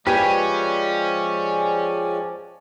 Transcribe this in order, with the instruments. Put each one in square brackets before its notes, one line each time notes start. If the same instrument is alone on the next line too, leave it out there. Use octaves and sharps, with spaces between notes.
[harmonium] F3 G#3 D5 [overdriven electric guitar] C#4 [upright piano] G4 [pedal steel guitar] B4 G#5